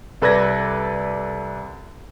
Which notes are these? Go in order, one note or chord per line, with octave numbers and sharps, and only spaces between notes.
C2 A4 B4 D5 G#6 A#6